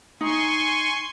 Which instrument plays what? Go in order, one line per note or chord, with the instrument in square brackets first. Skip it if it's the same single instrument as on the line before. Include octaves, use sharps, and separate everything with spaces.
[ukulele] D#4 [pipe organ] G#5 C6 C#6